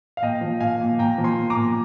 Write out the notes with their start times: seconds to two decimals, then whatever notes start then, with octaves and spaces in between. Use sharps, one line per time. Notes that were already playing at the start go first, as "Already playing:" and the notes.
0.17 F5
0.22 A#2 D#5 G5
0.41 F3
0.60 A#2 F5 G#5
0.80 A#2
0.99 A#2 G5 A#5
1.18 F3
1.24 G#5 C6
1.38 A#2
1.50 A#5 D6
1.56 A#2